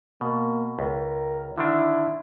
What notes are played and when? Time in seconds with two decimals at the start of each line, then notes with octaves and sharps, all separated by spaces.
0.21 B2 A#3
0.79 C#2 A#4
1.58 D3 D#3 D4 E4